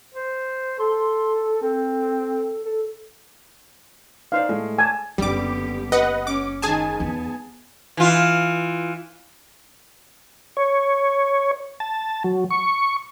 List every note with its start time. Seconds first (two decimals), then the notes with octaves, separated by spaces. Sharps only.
0.15 C5
0.79 A4 C6
1.62 C4 A4
2.65 A4
4.32 D#4 C5 D5 F5
4.49 A2 G#3 A3
4.78 G#5 A5
5.18 F#1 D3 G3 B3 G4 D6
5.92 B4 D#5 F#5
6.27 C#4 D6
6.62 G#2 D#3 G#4 G#5 A5
7.00 E2 B3
7.97 E3 F4
10.57 C#5
11.80 A5
12.24 F#3
12.50 C#6